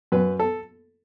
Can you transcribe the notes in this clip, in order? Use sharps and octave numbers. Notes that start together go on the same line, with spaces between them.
F#2 B4
A4